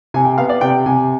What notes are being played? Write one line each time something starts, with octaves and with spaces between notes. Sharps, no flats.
C3 G#5
G5
B3 F5
D5
C3 G5
C3 G#5